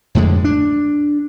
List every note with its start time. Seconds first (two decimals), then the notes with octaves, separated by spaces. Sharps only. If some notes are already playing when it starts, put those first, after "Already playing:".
0.15 F2 A2 D3 G#3
0.44 D4